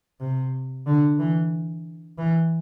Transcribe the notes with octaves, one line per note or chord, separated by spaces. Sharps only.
C3
D3
E3
E3